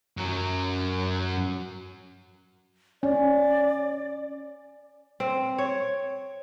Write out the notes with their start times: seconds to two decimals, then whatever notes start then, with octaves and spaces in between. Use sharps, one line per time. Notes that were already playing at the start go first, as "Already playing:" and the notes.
0.17 F#2 F#3
3.03 C#4 D5
5.20 C4
5.58 C#5